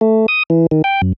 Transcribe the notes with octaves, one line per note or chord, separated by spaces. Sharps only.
A3
D#6
E3
D#3
G5
F#2